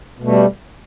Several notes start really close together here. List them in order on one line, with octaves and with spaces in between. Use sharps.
B2 A3 G3